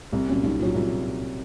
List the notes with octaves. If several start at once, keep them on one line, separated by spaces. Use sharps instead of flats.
C2 C4
A#2 F#3 C#4
C2 D#4
A#2 F#3 F4
C2 F4